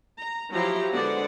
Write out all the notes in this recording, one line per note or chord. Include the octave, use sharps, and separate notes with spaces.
A#5
F3 F#3 E4 G4 A#5 C6
D3 G#3 B3 C5 D5 F#5